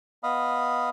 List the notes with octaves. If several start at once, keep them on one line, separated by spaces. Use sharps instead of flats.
B3 D#5 F5 B5 D#6